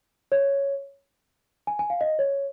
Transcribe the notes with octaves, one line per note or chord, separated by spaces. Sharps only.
C#5
G#5
G#5
F5
D#5
C#5